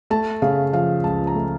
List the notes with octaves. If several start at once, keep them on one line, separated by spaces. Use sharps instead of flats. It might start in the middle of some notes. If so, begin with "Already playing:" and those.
A3 A5
C#3 F5
F3 F5
C#2 A5
A#5
A3